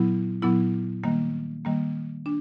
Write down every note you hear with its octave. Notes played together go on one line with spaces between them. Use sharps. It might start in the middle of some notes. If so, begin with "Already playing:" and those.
Already playing: A#2 F#3 B3 E4
A#2 F#3 B3 E4
D#3 G3 A#3
D#3 G3 A#3
D4